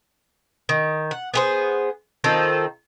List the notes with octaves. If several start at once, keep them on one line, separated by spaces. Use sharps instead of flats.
D#3
F#5
B3 G#4 C5
D#3 C4 F4 A4